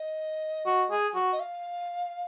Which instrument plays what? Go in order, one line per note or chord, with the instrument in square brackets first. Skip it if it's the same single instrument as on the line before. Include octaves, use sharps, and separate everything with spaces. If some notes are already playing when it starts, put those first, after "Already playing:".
Already playing: [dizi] D#5
[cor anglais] F#4
G#4
F#4
[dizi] D#5
F5